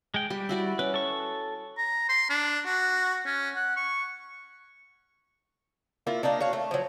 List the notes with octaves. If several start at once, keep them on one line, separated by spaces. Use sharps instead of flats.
G#3 G5
G3 G4
E4 F#4 D5
C#4 B4
A4 C#6
A#5
C6
D4
F#4
C#4
F#5
C#6
A#3 E4 F4
A#3 D4 D#4 F5
F#4 C#5 F5
A3
F3 F#3